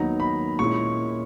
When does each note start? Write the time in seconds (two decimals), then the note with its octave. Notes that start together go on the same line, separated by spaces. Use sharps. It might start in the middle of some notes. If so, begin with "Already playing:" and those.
Already playing: D#2 D#3 F#3 B3 D#4 A#5
0.20 B5
0.59 A#2 G#3 C#4 E4 C#6